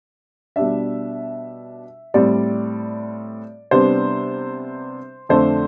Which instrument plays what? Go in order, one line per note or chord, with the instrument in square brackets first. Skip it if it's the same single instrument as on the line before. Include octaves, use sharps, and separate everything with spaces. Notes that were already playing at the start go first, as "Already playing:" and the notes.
[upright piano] B2 G3 D4 E5
A2 G3 C4 D5
C3 G3 B3 D4 C5
F2 D3 A3 D4 C5